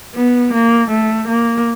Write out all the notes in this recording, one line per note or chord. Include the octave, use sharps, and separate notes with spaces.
B3
A#3
A3
A#3